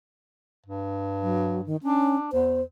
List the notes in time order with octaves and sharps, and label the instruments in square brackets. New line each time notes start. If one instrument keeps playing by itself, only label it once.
[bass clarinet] G2
[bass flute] F#3
D#3
[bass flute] C#4 [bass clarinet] D4
[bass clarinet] E2 [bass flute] C5